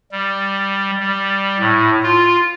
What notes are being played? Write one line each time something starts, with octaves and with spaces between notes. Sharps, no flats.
G3
G3
A2
F4